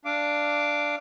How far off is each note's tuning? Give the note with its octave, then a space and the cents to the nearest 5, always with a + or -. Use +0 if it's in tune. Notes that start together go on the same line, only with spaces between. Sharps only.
D4 +0 F5 -20 D6 +0